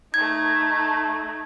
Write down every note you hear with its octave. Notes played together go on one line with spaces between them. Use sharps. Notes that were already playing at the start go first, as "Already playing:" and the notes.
A3 D#4 G#6